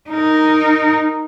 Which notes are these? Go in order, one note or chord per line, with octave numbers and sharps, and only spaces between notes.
D#4 A#4